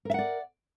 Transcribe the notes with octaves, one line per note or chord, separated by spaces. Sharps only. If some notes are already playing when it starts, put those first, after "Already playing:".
A#4 D5 E5 F#5